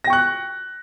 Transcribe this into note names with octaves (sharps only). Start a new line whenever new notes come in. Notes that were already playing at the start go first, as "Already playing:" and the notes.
G5 C#6 F#6 A#6